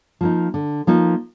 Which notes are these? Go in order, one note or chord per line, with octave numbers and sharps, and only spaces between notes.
F3 A#3 D#4
D3
F3 A#3 D#4